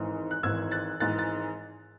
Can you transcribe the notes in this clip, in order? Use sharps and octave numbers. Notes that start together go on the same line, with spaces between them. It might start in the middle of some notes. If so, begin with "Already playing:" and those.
Already playing: G#1 G#2 E3
F#6
G#1 G#2 E3 E6 G#6
F#6 A6
G#1 G#2 E3 F#6 A6
A6